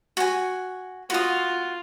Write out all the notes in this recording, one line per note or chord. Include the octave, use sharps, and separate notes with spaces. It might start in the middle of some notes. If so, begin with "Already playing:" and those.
F#4 G#5
F4 F#4 D#6